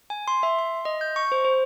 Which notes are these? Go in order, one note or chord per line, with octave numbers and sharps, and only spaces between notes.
G#5
C6
E5
C6
D#5
G6
C#6
C5
C5